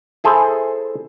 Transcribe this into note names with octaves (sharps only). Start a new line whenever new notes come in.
E4 G#4 A4 C5